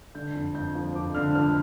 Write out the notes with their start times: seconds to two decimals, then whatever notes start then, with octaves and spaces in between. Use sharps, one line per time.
0.15 D3 G6
0.35 F2
0.55 F2 G6
0.75 F3
0.95 F2 D6
1.15 D3 F6
1.35 F3 F6